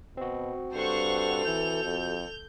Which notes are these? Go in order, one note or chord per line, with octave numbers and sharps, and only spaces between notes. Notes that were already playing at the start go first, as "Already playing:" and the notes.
B2 C4 F#4
G2 A4 C5 F#5 C#6 F7
E3 G6
F2